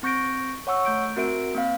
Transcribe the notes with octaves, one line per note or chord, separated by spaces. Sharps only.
C4 C#6 G6 A#6 D7
C#5 F#5 C#6 E6
A3 G6 D7
C4 F#4 A#4 E5 D7
A#3 C4 F5